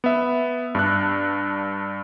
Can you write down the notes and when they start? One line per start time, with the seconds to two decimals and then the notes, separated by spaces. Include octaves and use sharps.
0.04 B3 E5
0.75 G2 D4 F#6